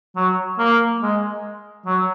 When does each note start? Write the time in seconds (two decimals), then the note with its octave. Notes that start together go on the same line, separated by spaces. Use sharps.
0.16 F#3
0.59 A#3
1.02 G#3
1.86 F#3